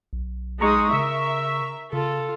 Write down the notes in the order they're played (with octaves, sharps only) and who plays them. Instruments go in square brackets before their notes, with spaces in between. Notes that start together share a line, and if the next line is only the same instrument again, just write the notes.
[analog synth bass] B1
[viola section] G#3 [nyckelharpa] D#4 D#6 [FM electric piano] A#5 C#6
[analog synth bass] C#3 [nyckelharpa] A#4 [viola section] E5
[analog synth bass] C#3 [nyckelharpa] F4 [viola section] A4